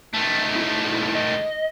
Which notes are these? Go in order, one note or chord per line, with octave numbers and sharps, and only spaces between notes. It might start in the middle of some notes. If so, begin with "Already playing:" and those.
D#3 A3
D#2 E4
D#5